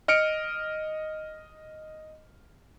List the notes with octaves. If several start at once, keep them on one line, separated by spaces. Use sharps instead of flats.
D#5 F6 C#7 D7